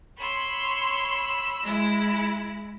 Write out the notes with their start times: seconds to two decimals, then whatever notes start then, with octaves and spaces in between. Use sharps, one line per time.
0.18 C#5 B5 C6 E6
1.63 G#3 E4